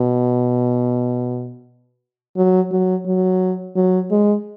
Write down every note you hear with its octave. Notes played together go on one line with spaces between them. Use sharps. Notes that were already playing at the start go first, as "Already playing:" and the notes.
Already playing: B2
F#3
F#3
F#3
F#3
G#3